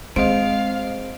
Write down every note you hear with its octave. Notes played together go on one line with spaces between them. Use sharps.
G#3 C4 C5 D#5 F5 D7